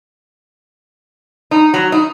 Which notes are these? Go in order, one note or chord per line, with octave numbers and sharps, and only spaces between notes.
D#4
F#3
D#4